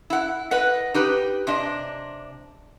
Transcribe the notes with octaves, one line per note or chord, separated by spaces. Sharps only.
E4 F#5
B4 D#5 F#5
D#4 G4 B4
C3 D4 D#5